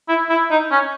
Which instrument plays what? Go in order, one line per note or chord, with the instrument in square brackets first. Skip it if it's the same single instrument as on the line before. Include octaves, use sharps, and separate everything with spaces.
[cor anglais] E4
E4
D#4
C#4